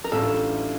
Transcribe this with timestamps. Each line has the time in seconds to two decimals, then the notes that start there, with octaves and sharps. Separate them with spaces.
0.04 A#4
0.12 A1 A2 G3 D4 F4 A4